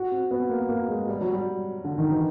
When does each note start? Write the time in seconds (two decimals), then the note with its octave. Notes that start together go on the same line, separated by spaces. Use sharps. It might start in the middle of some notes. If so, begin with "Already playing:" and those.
Already playing: F#4
0.12 C4
0.31 B3
0.50 A#3
0.69 A#3
0.88 G#3
1.09 G3
1.21 F#3
1.33 G3
1.84 D3
1.98 D#3
2.10 E3